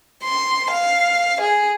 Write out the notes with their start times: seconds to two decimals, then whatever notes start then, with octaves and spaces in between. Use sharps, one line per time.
0.24 C6
0.71 F5
1.41 G#4